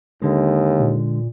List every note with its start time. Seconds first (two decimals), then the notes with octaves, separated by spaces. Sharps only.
0.22 D#2 D3 G#3
0.80 A#2